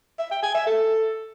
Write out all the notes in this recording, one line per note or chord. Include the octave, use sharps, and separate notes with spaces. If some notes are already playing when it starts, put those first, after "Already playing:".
E5
G5
G#5
E5
A4